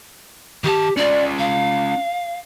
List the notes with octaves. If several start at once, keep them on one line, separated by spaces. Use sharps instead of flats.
D#3 G4 A5
C#4 F4 D5
F5